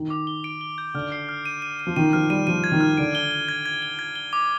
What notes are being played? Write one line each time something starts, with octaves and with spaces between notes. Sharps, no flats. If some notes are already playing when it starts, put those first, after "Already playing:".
Already playing: D#3
D6
G7
D7
G7
G6
D3 F6
C7
F6
D#7
D#7
D#7
F3
D#3 D#7
F3 F6
G3 D#7
F3 D#7
G#6
D#3
F6
D3 D7
G7
G7
G#6
G#6
G7
G#6
G7
D6